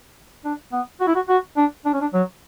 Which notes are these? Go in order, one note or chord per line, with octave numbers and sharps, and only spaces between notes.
D4
B3
F#4
E4
F#4
F#4
D4
D4
C#4
D4
F#3